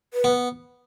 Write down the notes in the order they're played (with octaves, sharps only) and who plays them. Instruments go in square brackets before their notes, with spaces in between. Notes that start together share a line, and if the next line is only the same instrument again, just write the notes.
[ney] B4
[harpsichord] B3